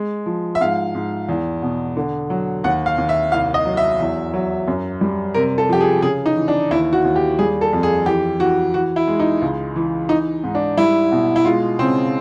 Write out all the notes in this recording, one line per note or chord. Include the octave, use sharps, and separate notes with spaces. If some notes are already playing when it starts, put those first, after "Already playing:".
Already playing: G#3
F3
E5
G#2 F5
G#2
E2
B2
D3
F#3
D#2 F#5
F5
D#2
E5
C2 F5
D#5
F#3
E5
E2
F#3
F#2
G3
C3 A#4
A4
F3 G4
G#4
C#3 G#4
D#4
E3
D4
D#2 E4
F#4
D#2
G4
G3 G#4
A4
F2
G#4
E3 G4
E3 F#4
E3 F#4
E4
G#3
D#4
C#2
E3
E3 D#4
G#2
D4
G3 E4
B2
E4
G#3 F4
C#3 C4